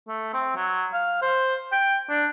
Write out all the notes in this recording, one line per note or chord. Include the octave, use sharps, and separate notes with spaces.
A3
C4
F#3
F5
C5
G5
D4